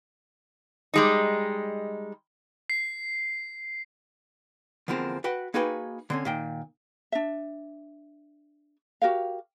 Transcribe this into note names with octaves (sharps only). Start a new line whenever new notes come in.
G3 G#3 D#4
C7
E2 D3 F3 A#3 C4
F#4 B4 F#5 G5
A#3 D#4 F#4 G#4 B4 G5
D3 C4 C#4
A#2 D#3 G5
D4 E5
F#4 G4 A#4 F5